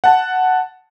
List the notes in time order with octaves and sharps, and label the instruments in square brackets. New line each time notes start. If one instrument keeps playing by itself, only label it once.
[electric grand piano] F#5 A5